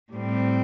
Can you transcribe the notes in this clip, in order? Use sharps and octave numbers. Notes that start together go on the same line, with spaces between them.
A2 G3 C4